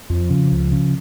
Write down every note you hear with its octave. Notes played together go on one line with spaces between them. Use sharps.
F2 F3
C#3
C#2
C#3